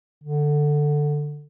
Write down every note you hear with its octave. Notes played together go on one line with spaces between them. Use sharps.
D3